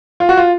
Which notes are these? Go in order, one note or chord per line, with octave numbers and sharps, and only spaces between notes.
F4
F#4
F4